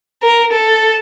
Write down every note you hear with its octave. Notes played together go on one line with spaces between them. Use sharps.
A#4
A4